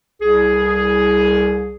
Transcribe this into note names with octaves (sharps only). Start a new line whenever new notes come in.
C2 G#4